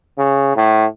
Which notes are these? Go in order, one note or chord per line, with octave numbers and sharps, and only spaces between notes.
C#3
A2